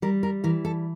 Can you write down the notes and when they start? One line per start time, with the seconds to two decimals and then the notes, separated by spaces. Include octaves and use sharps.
0.02 G3 A#4
0.23 A#4
0.44 E3 A#4
0.65 A4